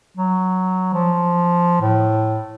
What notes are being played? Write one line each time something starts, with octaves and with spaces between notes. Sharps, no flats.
F#3
F3
A2